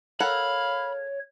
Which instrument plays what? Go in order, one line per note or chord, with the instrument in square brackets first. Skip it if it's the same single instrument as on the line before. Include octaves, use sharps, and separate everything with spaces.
[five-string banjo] A4 A#4 F#5 [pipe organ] C#5 [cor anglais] F5 [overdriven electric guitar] B5